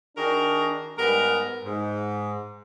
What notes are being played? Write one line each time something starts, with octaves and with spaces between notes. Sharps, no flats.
D#3 D4 F#4 G#4 A#4
G#2 G3 B3 A#4
G#2